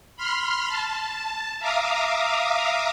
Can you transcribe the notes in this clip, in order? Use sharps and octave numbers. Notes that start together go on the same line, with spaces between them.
B5 C6 F6
A5
E5 F5 A#5 D6 D#6